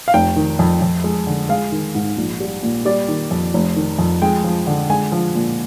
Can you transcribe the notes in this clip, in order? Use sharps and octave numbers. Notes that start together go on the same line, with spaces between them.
F5
F1 G5
D#3
F2
F2
G#3
D3
G#3 F5
D#3
G#2
A#1
G3
A#2
G3 D5
D#3
F2
F1
D#3
F2
G#3 G5
F3
D3
G#3 G#5
F3
A#2